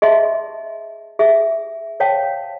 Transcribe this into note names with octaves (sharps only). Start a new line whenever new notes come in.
G#4 D#5 E5 A5 C6
G#4 E5
C5 C#5 F5 G5 A5